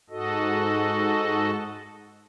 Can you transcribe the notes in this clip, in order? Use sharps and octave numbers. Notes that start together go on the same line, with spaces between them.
G#2 F#4 A4 D#5